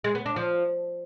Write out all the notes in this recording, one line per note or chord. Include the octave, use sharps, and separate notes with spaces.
G#3
B3
D4
F3